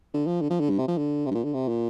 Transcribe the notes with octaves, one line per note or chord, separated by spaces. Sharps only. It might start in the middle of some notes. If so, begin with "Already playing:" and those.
D3
F3
D3
F3
D3
G2
C3
F3
D3
C3
G2
A#2
D3
C3
A#2